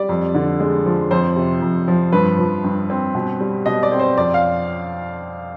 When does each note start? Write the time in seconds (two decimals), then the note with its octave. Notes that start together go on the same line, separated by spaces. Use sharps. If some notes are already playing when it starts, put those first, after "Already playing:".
Already playing: G3 D5
0.09 F2
0.35 D3
0.60 G#3
0.86 F3
1.11 F2 C5
1.36 C3
1.62 F2
1.88 F3
2.12 G2 B4
2.39 F3
2.64 G2
2.90 C4
3.15 B2
3.41 G3
3.66 B2 D#5
3.83 D5
3.92 C4
3.99 C5
4.18 F2 D5
4.34 F5